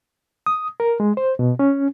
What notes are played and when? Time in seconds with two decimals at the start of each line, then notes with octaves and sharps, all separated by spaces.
0.46 D#6
0.80 A#4
1.00 G#3
1.17 C5
1.39 B2
1.59 C#4